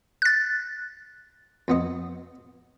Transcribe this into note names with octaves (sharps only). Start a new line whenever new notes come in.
F#6 A6
F2 B3 D#5